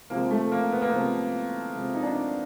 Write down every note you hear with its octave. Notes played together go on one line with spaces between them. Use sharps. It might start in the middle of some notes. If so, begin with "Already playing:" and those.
C3 F3 G#3 A#3
A3
A#3
B3
A#3
C3 F3 G#3 B3
C3 F3 G#3
D#4
D4